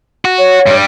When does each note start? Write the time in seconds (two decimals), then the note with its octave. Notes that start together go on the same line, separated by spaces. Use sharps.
0.25 F#4
0.39 C#5
0.66 G2 G3